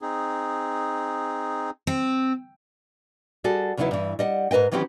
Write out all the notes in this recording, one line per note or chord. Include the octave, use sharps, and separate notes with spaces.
C4 D#4 G#4
C4
G3 F#4 G#4 A4
E2 C#3 F#3 D#4 E4 B4
G2 E3
G3 D#5 F#5
G#2 A#4 B4 D#5 G5
D#3 E3 F#3 C4 C#4 G4